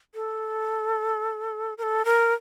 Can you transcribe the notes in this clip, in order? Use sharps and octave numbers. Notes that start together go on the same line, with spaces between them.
A4
A#4
A4
A#4